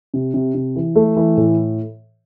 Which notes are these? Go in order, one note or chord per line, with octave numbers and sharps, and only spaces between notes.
C3
C3
C3
E3
A3
E3
A2